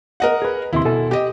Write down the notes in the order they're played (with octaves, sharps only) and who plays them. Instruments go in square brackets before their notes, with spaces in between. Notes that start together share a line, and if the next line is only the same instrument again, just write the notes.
[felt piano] A#4 D#5 F#5
[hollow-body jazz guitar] G#4 B4
[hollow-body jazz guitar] D#2 C3 C6 [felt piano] E4
[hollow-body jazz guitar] B2 A4 G#5
[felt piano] G4 D#5